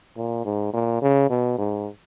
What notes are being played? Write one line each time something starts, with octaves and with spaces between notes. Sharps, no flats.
A#2
G#2
A#2
C#3
B2
G#2